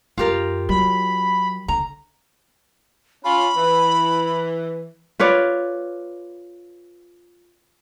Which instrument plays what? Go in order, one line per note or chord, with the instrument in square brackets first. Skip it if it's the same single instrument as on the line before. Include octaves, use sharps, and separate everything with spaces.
[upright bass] F#2 [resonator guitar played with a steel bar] F4 G4 A#4
[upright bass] F#3 [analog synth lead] B5
[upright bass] D3 [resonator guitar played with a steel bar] A#5
[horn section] C#4 F4 [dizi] B5
[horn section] E3
[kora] F4 B4 C#5 D5